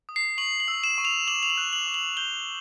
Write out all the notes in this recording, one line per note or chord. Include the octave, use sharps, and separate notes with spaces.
D#6
C7
C#6 F#7
F#7
E6
E7
C#6
F7
D6 F#7
F7
F#7
F#6
F#7
D6
F#7
G6 G7